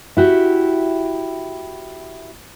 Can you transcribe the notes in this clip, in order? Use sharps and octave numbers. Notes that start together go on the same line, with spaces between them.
E4 F#4 G4